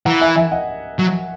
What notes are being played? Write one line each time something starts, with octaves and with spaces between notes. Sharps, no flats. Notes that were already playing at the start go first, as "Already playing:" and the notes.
E3 F#5 A#5
E5 G#5
E5 G#5
D#5 F#5
F#3